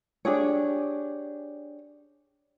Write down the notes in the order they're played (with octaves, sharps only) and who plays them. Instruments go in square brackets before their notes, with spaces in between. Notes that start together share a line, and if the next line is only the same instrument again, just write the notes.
[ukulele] D4 G4 G#4 C#5